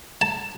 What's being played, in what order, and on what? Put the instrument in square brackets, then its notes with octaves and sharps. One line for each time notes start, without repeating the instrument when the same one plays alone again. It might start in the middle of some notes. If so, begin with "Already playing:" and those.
[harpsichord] A5